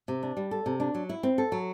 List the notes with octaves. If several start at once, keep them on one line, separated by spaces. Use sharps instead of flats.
C3
D4
G3
A4
C3
D4
F#3
E4
C4
A4
F#3